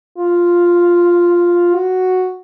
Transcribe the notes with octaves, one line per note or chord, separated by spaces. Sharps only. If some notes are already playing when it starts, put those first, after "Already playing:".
F4
F#4